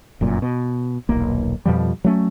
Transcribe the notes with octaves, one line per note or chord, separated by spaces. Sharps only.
F1 F#2 A#2
B2
D#1 B1 A#3
F2 B2 F3 G3
F#3 A3 C#4